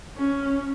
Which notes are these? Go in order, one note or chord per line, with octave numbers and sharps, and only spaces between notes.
C#4